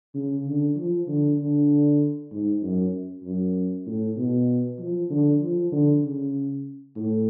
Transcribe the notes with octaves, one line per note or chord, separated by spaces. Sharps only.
C#3
D3
F3
D3
D3
G#2
F#2
F#2
A2
B2
F3
D3
F3
D3
C#3
A2